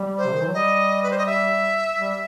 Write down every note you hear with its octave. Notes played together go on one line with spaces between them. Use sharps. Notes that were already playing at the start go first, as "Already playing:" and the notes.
Already playing: G3
C5
C3
D#3
E3
F#3
G3 D#5
B4
C5
D#5
E5
G3